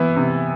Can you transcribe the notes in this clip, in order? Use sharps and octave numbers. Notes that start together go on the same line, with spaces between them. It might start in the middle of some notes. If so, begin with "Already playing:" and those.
Already playing: E3 B3 E4
C3